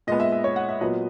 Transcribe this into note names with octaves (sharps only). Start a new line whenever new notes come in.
A#2 G#3 B3 D#5
E5
E5
C#5
F#5
E5
A#2 F#3 B3 D#5